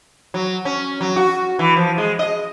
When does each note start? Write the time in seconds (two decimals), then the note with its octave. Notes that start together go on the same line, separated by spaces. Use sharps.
0.34 F#3
0.65 C#4
1.01 F#3
1.16 F#4
1.59 E3
1.77 F3
1.98 G#3
2.19 D#5